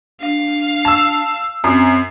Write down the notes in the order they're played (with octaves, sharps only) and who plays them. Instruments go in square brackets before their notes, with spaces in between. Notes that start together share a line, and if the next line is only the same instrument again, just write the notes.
[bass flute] D4 [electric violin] F5
[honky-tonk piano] A5 E6
[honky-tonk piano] F#2 [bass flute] C4